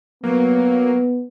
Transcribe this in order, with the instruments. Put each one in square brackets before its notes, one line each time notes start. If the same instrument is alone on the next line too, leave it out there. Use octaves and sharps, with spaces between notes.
[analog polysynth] F#3 A#3 [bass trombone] B3